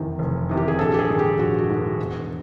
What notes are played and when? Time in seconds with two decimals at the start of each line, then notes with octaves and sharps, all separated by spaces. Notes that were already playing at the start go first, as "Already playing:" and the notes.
Already playing: F1 E2 C3 D#3
0.19 F1
0.49 E2 C3 D#3
0.57 G4
0.68 G#4
0.79 A#1 A4
0.94 G4
0.99 G#4
1.09 G#2 D#3
1.19 G4
1.38 A#1 F#4
1.58 F#4
1.69 G#2 D#3
1.99 E1